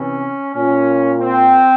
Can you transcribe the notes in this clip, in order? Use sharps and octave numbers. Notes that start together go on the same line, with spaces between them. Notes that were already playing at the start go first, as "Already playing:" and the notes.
Already playing: C3 E3 C#4
A#2 C#4
C4